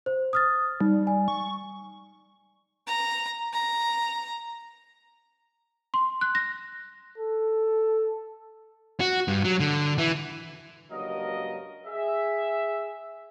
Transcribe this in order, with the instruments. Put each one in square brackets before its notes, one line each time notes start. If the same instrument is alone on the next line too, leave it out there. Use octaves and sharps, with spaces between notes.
[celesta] C5
D#6 F6 A6
[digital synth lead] G3 [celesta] D#4
[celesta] G#5
[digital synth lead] C#6
[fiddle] A#5
A#5
[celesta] C6
F#6
A#6
[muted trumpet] A4
[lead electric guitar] F#4
G2
F#3
D3
E3
[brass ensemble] C#2 G2 F#3 A#3 A#4 D#5
G#4 E5